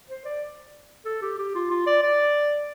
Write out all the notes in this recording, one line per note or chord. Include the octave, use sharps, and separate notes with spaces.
C5
D5
A4
G4
G4
F4
F4
D5
D5